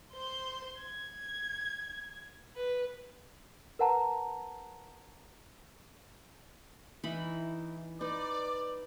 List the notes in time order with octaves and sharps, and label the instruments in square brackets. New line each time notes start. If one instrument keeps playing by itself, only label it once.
[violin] C5 C6
G#6
B4
[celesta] A#4 B4 F#5 A5 A#5
[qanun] E3 D#4 B5 [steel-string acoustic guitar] E4
[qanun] D#4 [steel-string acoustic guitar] B4 [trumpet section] D5